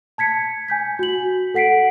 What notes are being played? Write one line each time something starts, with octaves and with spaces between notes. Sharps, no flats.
A5 G#6 B6 C#7
G#5 G6 B6
F#4 F#7
A4 F#5 B6 C7 D7